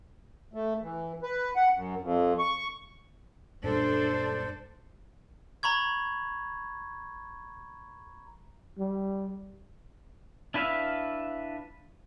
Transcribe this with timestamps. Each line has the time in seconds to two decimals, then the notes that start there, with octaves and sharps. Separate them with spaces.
0.54 A3
0.82 E3
1.23 B4
1.56 F#5
1.75 F#2
2.01 F2
2.39 C#6
3.64 F#2 A#2 G3 D4 A4 C5
5.63 A#5 B5 C#6 G#6
8.79 G3
10.54 D4 E4 B4 E5 F5